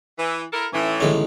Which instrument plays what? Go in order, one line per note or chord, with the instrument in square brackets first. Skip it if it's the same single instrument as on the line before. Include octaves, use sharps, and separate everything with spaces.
[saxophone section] E3
E4 A4 A#4
[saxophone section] A2 E3 [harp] C#4 E4 D7
[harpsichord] A1 G#3 C#4 [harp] D3 D#3 B3